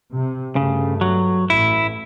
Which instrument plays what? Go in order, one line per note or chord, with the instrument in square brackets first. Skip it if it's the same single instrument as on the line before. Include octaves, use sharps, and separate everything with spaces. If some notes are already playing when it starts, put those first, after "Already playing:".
[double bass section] C3
[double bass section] G2 A3 [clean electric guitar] C#3
[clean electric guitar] F#3
[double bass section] A1 [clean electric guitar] E4